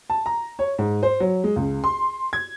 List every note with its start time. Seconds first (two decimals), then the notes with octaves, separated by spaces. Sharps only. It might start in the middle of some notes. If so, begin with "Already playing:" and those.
0.10 A5
0.26 A#5
0.59 C#5
0.78 G#2
1.03 C5
1.20 F#3
1.44 G#3
1.56 C#2
1.84 C6
2.33 G#6